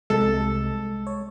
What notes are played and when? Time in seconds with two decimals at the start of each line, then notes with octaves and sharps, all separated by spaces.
0.10 C2 C3 G#3 A4
1.07 C#5